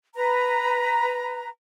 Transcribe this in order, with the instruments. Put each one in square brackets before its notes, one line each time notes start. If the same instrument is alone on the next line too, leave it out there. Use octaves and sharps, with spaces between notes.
[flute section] B4 A#5